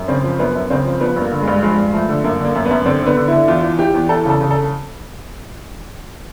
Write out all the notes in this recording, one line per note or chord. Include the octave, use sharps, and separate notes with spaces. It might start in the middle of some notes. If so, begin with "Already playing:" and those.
Already playing: F#2
C#3 C4
F3
F#2 B3
F#2
C#3 C4
F3
F3 B3
G2
A#3
D3
G#3
G2
F3 G#3
G2
F3 A3
D3
F#2 A#3
D3 A#3
F#2
F#2 B3
D3 C4
D3 B3
D3
D3 E4
E2 F4
E3
E3 G4
E2
E3 A4
C#3 A4
C#3
A4